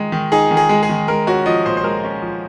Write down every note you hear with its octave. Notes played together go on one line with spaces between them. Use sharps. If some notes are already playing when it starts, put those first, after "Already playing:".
Already playing: D#3 G#3 D#4
D#3
D#4 G#4
D#3
G#4
G#3
G#4
D#3
G#3 A#4
C#4 F#4
F3 D#5
A#2 C5
C5
G#3 A#4
C#4
F3